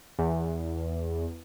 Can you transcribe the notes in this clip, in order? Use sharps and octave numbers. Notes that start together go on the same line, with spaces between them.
E2